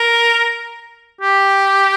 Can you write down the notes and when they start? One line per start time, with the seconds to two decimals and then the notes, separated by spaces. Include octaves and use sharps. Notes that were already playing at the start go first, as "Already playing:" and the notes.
Already playing: A#4
1.21 G4